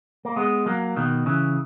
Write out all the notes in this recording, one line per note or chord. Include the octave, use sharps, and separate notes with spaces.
A#3
G#3 B3
F#3 A#3
B2 D#3
C#3 E3